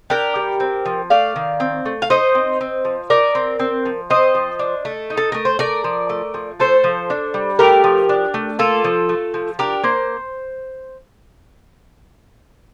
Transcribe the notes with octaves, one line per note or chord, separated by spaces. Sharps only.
D4 G4 A#4
G3
C4
F3
A3 D5 F5
D#3
C4
A3
F5
D#4 C5 D#5
C4
C4
F3
D#4 A#4 D5
C4
C4
F3
C4 C5 D#5
F3
D4
A3
D#4
A4
A3 A#4
C5
A3 A#4 D5
F3
A3
F3
A3 A4 C5
F3
D4
G3
A3 G4 A#4
F3
D4
A3
A#3 F4 A4
F3
A3
F3
D4 G4 A#4
A#3 C5